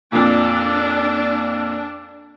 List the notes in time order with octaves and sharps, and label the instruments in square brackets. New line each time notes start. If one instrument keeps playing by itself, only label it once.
[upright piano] F2 A#2 [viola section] D4